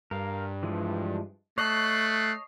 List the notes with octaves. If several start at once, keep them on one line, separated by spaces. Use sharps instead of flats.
G2 A#4 F5
E3 F3 G#3
A3 C#5 D#5 A5 F#6 C7